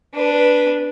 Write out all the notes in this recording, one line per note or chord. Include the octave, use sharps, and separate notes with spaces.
D4 B4